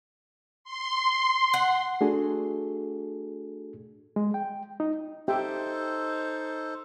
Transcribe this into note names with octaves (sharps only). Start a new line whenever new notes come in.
C6
F#5
A3 D4 F#4 G#4 A4
G#3
G5
D#4
D#4 G4 A4 C5 E5 G5